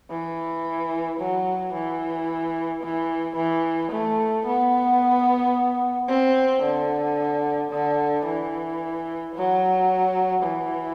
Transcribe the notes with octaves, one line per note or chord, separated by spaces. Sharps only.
E3
F#3
E3
E3
E3
A3
B3
C4
D3
D3
E3
F#3
E3